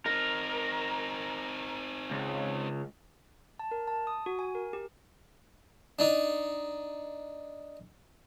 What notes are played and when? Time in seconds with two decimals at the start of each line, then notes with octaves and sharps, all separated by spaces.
0.06 C4 D#4 A#4
2.11 C#2
3.59 A5
3.71 A#4
3.88 A5
4.07 D#6
4.26 F#4
4.39 G#5
4.55 A#4
4.73 G4
5.99 D4 D#4